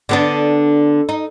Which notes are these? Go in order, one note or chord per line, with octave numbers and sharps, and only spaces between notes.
D3 B3 D4
D#4